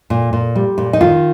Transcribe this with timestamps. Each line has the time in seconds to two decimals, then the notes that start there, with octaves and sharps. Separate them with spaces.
0.10 A#2
0.33 A#2
0.56 G3
0.78 A#2
0.93 D#4
1.01 D#3 F4